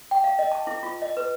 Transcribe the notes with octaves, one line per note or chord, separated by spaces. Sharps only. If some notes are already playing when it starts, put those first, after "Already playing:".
G5
F5
D#5
A5
E4
F4
D#5
B4